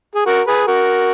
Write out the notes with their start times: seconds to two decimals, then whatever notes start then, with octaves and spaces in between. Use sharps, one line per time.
0.15 G#4
0.26 F#4 A#4
0.47 G#4 B4
0.67 F#4 A#4